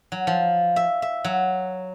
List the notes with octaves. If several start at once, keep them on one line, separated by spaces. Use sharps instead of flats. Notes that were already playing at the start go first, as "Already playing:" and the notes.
F#3
F3
E5
E5
F#3